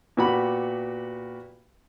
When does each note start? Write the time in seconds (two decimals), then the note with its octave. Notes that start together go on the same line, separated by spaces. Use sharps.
0.17 A#2 B3 F#4 G4 B5